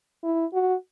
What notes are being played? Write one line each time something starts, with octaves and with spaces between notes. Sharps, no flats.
E4
F#4